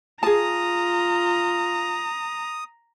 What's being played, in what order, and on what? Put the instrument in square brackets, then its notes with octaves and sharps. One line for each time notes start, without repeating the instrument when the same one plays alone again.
[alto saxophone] F4 [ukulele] G#4 A5 [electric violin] A#5 [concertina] D#6